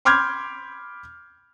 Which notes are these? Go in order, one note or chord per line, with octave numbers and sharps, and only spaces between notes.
B5 C6 D6 F6 G6 G#6